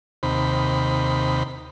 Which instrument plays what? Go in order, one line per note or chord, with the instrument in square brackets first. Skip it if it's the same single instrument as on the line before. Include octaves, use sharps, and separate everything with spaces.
[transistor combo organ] D#2 C3 B5